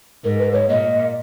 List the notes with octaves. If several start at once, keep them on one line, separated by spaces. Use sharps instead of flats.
G#2 A#4
B4
C#5
A#2 D#5